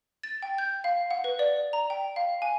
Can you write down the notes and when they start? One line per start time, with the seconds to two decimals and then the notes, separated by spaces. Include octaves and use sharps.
0.23 A6
0.42 G5
0.58 G6
0.84 F5
1.11 F#5
1.24 B4
1.39 D5
1.73 A#5
1.90 G5
2.16 F5
2.42 G#5